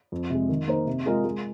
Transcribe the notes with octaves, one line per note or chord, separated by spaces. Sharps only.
F2
C3 G#3
D#3
A#3 D#4 C5
C3
G#3 F4 A#4 D#5
G#3